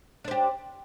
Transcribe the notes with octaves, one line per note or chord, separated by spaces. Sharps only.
D4 G4 C5